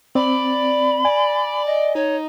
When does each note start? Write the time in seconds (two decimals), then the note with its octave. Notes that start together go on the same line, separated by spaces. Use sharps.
0.15 C4 D5 B5
1.05 D5 G#5
1.66 D#5
1.95 D#4 C#5